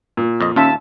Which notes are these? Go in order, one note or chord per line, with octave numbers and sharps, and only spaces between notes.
A#2
F2 D#5
D#2 C#4 F4 E5 A5 E6 B6